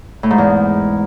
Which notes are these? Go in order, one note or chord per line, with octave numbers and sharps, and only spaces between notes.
A2
G#2
E2